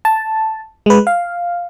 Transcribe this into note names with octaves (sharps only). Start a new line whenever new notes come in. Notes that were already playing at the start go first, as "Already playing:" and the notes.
A5
G#3 B4
F5